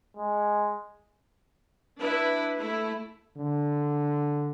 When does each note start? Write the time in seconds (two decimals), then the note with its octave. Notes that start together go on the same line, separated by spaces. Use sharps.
0.17 G#3
2.00 D4 E4 B4
2.59 A3 E4
3.37 D3